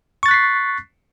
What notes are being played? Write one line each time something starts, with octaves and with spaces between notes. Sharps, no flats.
C#6 F#6 A6 B6 C7